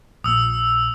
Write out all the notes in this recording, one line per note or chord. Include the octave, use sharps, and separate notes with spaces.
A#1 A#2 D#6 E6